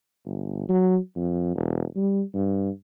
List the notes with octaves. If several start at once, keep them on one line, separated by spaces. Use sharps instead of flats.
G1
F#3
F2
E1
G3
G2